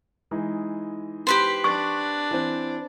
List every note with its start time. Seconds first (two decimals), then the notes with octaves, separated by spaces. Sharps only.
0.31 E3 G#3 D#4
1.27 G4 B4 C5
1.64 D4 C#6
2.31 E3 C4